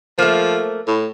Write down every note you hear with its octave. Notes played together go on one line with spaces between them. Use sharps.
F3 A3 A#3
A2